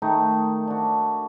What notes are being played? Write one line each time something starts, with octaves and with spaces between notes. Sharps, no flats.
D#3 A3 D#4
D4 F#4